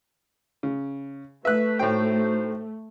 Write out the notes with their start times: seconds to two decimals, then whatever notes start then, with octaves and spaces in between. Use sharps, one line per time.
0.63 C#3
1.45 A3 B4 E5 F#6
1.79 A2 D#4 F#4 C5 G5